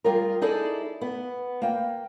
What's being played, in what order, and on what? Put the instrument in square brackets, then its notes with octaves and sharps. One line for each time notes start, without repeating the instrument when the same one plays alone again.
[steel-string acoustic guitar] G3 F4 G#4 A#4
D#4 E4 G#4 A4 D5
B3
A#3 G5